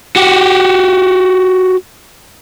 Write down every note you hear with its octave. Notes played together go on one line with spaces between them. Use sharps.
F#4 G4